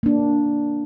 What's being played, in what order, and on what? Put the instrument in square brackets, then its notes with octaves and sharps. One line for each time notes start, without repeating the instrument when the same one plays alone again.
[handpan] A#3 D4